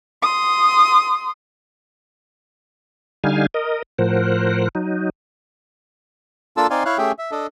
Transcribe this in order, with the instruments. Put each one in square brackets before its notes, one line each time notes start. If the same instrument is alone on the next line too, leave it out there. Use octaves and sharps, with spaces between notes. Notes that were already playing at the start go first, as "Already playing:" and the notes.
[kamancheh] C6 D#6
[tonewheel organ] D3 G3 D#4 F5 G#5
A#4 D#5
A2 F3 A#4 C5 F#5
F#3 D#4
[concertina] A#3 D4 F4 A4 A5 E6
C4 D#4 D5 F5 G#5 C6
E4 C#5 F5 F#6
A3 C#4 G4 G#4 E5 G5
E5
D4 A4 D#5